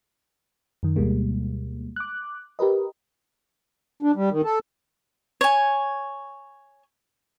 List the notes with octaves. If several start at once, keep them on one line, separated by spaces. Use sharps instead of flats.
F#2 D#3
D2 B2 G3 G#3 A#3
D6 F#6
G4 A#4 B4 D#5
D4
G3
D#3
A4
C#5 G#5